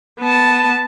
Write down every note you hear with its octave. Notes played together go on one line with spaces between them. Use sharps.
B3 A5